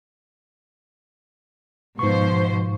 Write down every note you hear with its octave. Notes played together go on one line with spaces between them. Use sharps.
G#2 B2 F3 C5 C#6